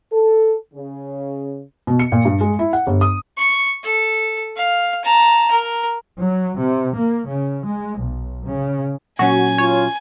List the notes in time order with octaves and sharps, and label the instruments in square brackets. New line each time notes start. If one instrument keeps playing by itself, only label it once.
[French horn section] A4
C#3
[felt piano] B2
C#7
A#2
G2
G#3
E4
F#5
G1
D#6
[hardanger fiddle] C#6
A4
F5
A5 A#5
A#4
[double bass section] F#3
C3
A#3
C#3
G#3
B1
C#3
[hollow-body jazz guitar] A#2 F#3 C#4 [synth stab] F#4 [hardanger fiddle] G#5
[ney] F4 [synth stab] C#5